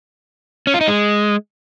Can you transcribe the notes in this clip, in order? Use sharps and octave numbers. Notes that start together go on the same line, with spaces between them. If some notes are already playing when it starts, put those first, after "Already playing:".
C#4
F4
D#4
G#3